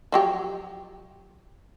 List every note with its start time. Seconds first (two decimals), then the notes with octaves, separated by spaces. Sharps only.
0.12 F3 F#3 G4